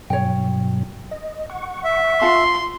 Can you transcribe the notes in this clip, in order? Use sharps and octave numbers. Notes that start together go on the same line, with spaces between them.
G2 B2 F#3 C#5 G5
D#5
F#5 C#6
E5
F4 F5 A5 C6